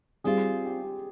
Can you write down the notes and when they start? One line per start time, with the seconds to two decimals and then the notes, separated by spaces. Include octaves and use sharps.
0.24 G3 C4 F4 G#4
0.65 G4